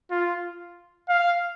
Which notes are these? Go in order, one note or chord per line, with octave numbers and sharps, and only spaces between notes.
F4
F5